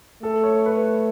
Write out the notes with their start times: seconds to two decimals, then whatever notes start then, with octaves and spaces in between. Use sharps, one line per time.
0.23 A3 A4
0.44 C#5
0.66 B4